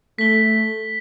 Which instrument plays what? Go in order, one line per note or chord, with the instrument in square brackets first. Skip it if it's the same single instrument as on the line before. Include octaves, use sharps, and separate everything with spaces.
[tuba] A3 [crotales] B6 G7